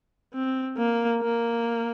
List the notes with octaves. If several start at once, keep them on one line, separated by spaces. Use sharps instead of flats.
C4
A#3
A#3